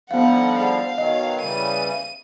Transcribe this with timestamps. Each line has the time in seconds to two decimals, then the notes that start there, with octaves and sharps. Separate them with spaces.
0.11 D3 F3 G3 B3 D#4 F5 F#5
0.59 G#4 F5 F#5 B5
0.98 B2 D#3 F#3 D#5
1.42 C#3 E3 G3 D#7